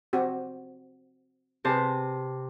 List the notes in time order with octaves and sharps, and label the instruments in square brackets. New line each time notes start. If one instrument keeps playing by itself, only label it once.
[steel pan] C4 F#4 G4
[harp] C3 C5 A5 [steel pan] G4 G#4 B4